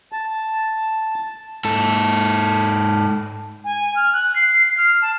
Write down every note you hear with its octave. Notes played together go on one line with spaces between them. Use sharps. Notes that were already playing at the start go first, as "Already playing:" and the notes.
A5
G#2 A4
G#5
F6
F#6
C7
C7
F6
A5